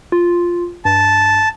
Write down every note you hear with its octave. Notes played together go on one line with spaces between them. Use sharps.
F4
G2 A5